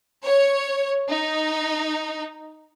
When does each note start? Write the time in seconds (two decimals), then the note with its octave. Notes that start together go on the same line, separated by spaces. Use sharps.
0.24 C#5
1.10 D#4